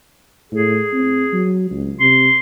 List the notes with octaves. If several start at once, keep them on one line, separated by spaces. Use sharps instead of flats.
A2 G#4
C4
F#3
C#2
C3 C6